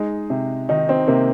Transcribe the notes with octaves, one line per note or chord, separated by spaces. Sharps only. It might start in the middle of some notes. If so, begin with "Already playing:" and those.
Already playing: G#3 D#4
C3
D#3 D#4
C4
C3 A#3